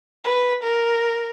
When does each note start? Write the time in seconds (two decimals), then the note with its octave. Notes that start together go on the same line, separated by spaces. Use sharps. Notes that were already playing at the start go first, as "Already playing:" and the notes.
0.25 B4
0.64 A#4